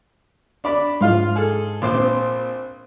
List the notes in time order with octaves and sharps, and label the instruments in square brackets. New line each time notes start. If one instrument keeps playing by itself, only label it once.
[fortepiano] D4 D5 B5
[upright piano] G#2 [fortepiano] F4 F5 C6
[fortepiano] G#4 A4
A#1 C5 D6
[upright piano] C4